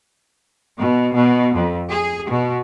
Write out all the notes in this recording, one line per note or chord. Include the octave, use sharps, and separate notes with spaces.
B2
B2
F2
G#4
B2